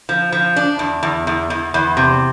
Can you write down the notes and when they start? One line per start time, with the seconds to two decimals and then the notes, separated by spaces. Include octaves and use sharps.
0.09 F3
0.32 F3
0.56 D4
0.79 E2
1.03 E2
1.27 E2
1.50 E2
1.74 E2
1.97 C3